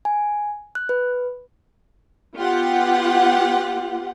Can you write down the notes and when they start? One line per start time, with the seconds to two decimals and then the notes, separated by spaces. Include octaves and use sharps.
0.05 G#5
0.75 F#6
0.89 B4
2.37 B3 F4 G4 F#5